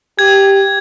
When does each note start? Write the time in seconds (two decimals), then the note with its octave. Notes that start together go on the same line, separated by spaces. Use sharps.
0.19 G4 G#6